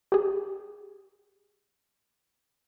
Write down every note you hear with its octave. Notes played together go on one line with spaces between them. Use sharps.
G4 G#4